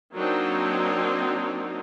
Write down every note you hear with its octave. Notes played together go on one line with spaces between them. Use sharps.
F#3 A#3 C4 D4 D#4